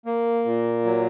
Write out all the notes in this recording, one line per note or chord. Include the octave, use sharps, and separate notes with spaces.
A#3
A#2
F#3